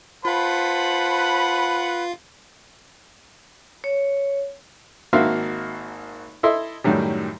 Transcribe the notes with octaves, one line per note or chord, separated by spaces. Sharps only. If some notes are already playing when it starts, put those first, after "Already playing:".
F4 B4 C5 F5 F#5 A5 B5
C#5
G#1 A#3 F#4 E5 F5 C6
E4 A4 D#5 E5 C6
F#2 A2 D#3 F#3 G3